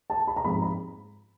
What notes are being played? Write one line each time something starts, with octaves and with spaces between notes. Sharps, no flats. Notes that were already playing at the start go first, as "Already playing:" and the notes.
A5
B5
A#5
G#2 F3 G#3 C4 B5
B5